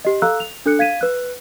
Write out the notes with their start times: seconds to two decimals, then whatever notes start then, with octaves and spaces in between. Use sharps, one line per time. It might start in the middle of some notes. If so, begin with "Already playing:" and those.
0.05 G4 D#5
0.22 A4 F5 A#5 E6 F#6
0.40 F7
0.66 D4 A4 F#6 C#7
0.79 F5 G#6 B6 D#7 E7
1.01 B4 F#6